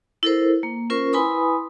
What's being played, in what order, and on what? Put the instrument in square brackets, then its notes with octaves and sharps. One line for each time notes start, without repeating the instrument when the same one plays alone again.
[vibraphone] E4 A4 A#4 C5
A#3
C#4 F4 A#4 C5 C#6
E4 B4 G#5 B5 C6 D#6